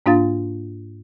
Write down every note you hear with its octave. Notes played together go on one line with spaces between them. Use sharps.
G#2 A#3 D4 F4 F5 A6